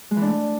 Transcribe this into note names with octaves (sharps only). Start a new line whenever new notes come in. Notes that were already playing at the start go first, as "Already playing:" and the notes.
G#3
E3
D4
A3